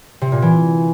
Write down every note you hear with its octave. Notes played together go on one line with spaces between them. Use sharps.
C3
A#2
E3